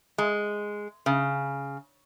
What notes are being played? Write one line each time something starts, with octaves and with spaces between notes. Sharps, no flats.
G#3
C#3